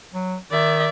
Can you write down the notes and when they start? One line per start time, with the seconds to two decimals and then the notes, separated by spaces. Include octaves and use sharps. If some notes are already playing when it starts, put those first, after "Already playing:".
0.14 F#3
0.51 D#3 D5 E5